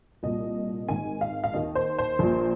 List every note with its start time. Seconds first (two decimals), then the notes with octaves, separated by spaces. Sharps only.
0.23 C2 A#2 D#5
0.89 G#1 G#2 D#3 G#5
1.21 F5
1.44 F5
1.54 D#2 D#3 D#5
1.75 C5
1.98 C5
2.19 A#1 A#2